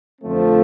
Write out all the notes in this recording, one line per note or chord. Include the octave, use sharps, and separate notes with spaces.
F2 D3 F3 A3 C4